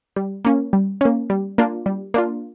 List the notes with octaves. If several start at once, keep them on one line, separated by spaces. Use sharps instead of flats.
G3
A#3 C#4
G3
A#3 C#4
G3
A#3 D4 F4
G3
A#3 D4 F4